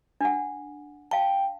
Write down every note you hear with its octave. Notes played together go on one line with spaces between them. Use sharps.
D4 F#5
F5 G5 A5